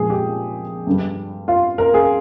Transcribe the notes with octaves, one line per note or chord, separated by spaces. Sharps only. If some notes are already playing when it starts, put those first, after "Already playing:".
Already playing: A#2 F3 G#3 G#4
G4
G2 D3 G3
F4
A#4
G#4